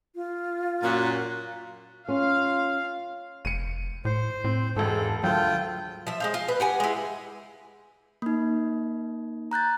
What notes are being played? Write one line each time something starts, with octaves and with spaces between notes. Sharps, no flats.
F4
F#2 A#2 F#4
C#4 F4 F5
F1 C#7 D#7
A2 C5
A2 C4
E1 G#2 G#3 A4
D2 F#3 F4 A4 G5
F3 E5
G#3 C5 F5
F4
B4
G4 F#5 G#5
G#3 E4
A#3 D#4
A#5 F#6 G6 A6